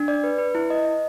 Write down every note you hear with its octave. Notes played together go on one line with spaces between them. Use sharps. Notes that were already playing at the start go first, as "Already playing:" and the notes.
Already playing: D4
D5
B4
B4
E4
D#5
D#5